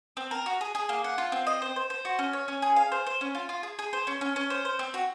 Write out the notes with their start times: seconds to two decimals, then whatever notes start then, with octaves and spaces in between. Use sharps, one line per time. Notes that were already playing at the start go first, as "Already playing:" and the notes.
0.17 C4
0.31 A#4
0.46 F#4
0.61 G#4
0.75 G#4
0.89 A#3
1.04 F#5
1.18 F4
1.32 C4
1.47 D#5
1.62 C5
1.76 C5
1.90 C5
2.05 F#4
2.19 C#4
2.33 C#5
2.48 C#4
2.62 G#4
2.76 F5
2.92 C5
3.06 C5
3.21 C#4
3.35 F4
3.49 F4
3.63 G#4
3.79 G#4
3.93 C5
4.07 C#4
4.21 C#4
4.36 C#4
4.50 C5
4.65 C5
4.79 C4
4.94 F#4